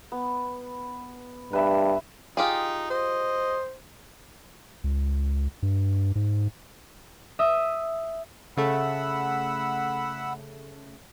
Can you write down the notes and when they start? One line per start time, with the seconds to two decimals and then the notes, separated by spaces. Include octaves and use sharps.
0.12 B3
1.53 G2 B4 E5 B5
2.37 D#4 F4 G4 G#4
2.91 C5 D#5
4.84 C#2
5.62 G2
6.15 G#2
7.39 E5 D#6
8.57 C#3 A3 F#5 B5 E6